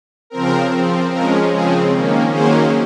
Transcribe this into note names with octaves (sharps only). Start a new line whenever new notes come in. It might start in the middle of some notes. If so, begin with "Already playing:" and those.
C#3 F3 C4 A#4
F3 C4
F3 G#3 C#4 A#4
C#3 F3 C4 G#4
D#3 A#3 C#4
D#3 F#3 A#3 C#4 G#4 C5